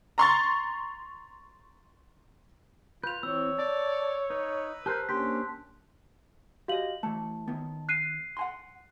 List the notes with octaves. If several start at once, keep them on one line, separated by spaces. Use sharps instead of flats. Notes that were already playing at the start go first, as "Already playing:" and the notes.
A#5 C6 C#6 A6
F4 B4 G6 F7
E3 C4 C#5 E6
D5 A5
D#4 B4
G4 A#4 C5 A5 F#6 G6
A#3 C#4 D4 G4 C5 C6 B6
F#4 G4 D#5 F5 F#7
E3 A3 A5
D#3 B3
F#6 C7 D#7
F#5 G#5 C6